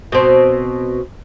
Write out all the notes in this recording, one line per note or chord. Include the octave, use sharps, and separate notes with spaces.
B2 C4